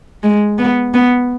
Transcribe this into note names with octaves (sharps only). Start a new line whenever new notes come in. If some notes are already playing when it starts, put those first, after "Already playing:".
G#3
B3
B3